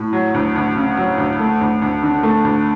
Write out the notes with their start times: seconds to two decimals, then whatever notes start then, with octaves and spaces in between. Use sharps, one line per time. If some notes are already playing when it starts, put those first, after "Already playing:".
Already playing: A2
0.13 F#3
0.34 D2
0.56 D2
0.76 C#3
0.97 F#3
1.18 D2
1.39 A3
1.61 D2
1.82 D2
2.03 D3
2.23 A3
2.44 D2